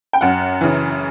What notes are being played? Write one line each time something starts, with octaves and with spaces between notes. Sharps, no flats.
G5
F#2 F#5
C#3 E3